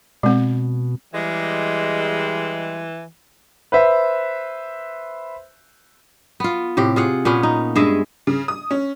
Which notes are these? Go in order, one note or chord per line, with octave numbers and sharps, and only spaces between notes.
B2 G#3 C4
E3 G3 G#3
B4 C5 E5
B3 F4
A2 C3 G4
F4 G#4 F#5
A#2 B3 C#4
D#4
G2 G#3 G#4 E5
C#3
D#6
C#4